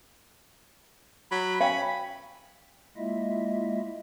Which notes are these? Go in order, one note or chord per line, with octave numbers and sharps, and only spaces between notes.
F#3 B5
C#4 F5 G5 B5
G#3 A#3 E4 F4 D#5 E5